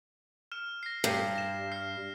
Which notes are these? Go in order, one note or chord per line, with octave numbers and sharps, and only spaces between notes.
F6 E7
A#6 C7
G2
A#6 E7
F6 C7